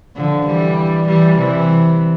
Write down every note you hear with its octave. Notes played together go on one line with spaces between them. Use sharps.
D3 F3
E3 G3
E3 G3
C3 E3